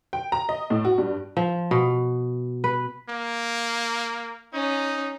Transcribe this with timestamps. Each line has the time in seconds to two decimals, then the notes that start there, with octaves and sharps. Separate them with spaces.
0.13 G5
0.32 A#5
0.49 D#5
0.70 A2
0.85 F#4
0.98 G2
1.37 F3
1.71 B2
2.64 B4
3.09 A#3
4.53 C#4 D#4